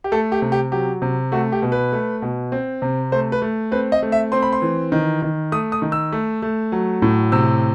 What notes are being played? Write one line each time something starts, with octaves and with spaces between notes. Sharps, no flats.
G4
A3 A4
G4
C3
G4
F#3 G4
C3
A3 F#4
G4
B2
B4
A3
B2
C4
C3
A3 C5
B4
A3
C4 B4
D#5
A3
E5
C4 C6
B5
C6
E3
D#3
D#3
A3 D#6
D#6
D#3
E6
A3
A3
F#3
A2
C3 E6